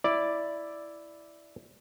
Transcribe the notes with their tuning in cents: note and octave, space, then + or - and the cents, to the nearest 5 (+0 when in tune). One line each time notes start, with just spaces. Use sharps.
E4 +0 D5 +0